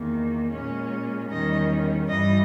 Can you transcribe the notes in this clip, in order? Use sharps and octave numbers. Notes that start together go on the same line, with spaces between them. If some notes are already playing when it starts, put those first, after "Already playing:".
Already playing: E2 D#3 A#3
A#2 G#3 C#4
E2 D#3 G3 C#4 D#5
G2 E3 G3 D#5